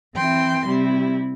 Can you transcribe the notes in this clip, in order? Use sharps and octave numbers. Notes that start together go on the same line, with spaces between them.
E3 C4 E4 G5 C6
C3 G3 C4 E4